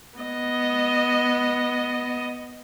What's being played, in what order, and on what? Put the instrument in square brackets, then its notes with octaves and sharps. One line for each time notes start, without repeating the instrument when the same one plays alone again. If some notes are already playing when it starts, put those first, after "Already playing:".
[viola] B3 D#5